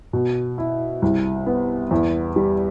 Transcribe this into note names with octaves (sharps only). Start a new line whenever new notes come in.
B2
E4
C2
B3
E2
G3